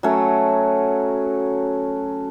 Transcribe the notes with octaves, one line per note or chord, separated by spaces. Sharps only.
F#3 A3 C#4